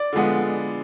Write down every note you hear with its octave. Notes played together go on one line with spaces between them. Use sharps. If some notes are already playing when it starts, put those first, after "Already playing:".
Already playing: D5
D3 F3 G#3 B3